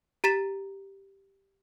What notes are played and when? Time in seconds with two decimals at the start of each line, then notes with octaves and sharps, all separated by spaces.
0.24 G4 A#5 A6 B6 E7